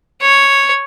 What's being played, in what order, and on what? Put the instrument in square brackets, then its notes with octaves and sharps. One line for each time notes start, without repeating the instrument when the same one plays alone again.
[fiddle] C#5